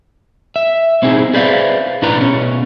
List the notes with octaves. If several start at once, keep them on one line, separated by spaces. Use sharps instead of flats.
E5
B2 C4 D#4 E4 G#4
G#4 B4 C5 D5 E5 F5
A#2 D4 E4 B4 A#5
B2 C#4